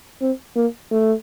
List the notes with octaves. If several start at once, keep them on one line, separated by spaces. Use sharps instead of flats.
C4
A#3
A3